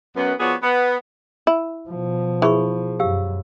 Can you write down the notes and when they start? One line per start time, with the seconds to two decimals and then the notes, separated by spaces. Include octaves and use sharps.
0.16 F#2 B3
0.40 F3 B3 F#4 G#4 C#5 D5
0.62 B3
1.47 E4
1.89 B2 F3
2.42 E3 G#4 B5 C#6
3.00 F#2 G4 F5 E6